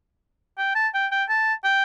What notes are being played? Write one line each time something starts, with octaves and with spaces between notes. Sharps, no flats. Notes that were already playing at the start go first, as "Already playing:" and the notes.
G5
A5
G5
G5
A5
G5